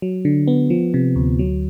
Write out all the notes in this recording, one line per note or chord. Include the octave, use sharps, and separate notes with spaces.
F#3
D3
B3
F3
C3
D2
F#3